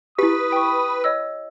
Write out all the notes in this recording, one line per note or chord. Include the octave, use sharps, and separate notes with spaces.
E4 G4 B4 D#6
G5 C#6
C#5 D#5 E6